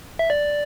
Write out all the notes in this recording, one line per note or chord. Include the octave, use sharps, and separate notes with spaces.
E5
D5